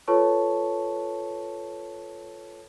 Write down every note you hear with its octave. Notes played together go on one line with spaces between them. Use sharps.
F4 A4 B4 C#5 A5 C#6